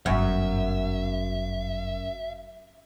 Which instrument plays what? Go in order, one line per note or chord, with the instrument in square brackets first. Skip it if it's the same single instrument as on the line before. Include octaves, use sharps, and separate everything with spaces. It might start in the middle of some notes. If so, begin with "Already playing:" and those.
[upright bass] D1 G1 [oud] F#2 [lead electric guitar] E5